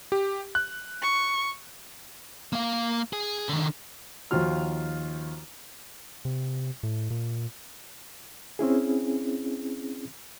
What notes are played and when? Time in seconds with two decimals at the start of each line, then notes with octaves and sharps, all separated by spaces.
0.12 G4
0.55 F#6
1.02 C#6
2.53 A#3 F5
3.13 G#4
3.49 D3 D#3
4.31 D#2 D#3 F3 F4 F#4 F6
6.25 C3
6.83 A2
7.10 A#2
8.59 C4 C#4 E4 G#4